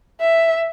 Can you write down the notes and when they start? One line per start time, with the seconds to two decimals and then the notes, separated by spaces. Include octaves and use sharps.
0.21 E5